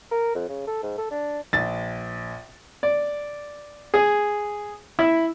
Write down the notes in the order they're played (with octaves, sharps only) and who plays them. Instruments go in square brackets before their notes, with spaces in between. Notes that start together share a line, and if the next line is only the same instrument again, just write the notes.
[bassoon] A#4
F2
C#3
A4
G#2
A4
D4
[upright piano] A#1 A6
[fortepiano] D5
G#4
E4